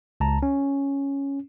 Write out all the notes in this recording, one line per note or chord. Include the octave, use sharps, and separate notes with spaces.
C#2 A5 A#5
C#4